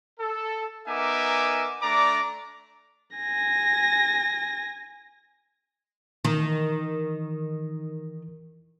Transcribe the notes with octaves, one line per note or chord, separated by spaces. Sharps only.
A4
B3 D#4 A#4 E5 G#5 D6
A3 D4 D5 A#5 D6
G#5 A#6
D#3 E3